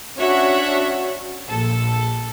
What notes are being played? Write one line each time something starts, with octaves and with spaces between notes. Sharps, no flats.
C#4 D4 F#4 C#5 E5 F#5
A#1 A4